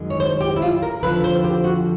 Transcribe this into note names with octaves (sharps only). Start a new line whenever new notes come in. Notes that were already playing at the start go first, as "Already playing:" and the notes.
Already playing: F#2 D#3 G#3
C#5
C5
G4
E4
F4
A#4
F2 D3 F3 B4
C5
G4
F#4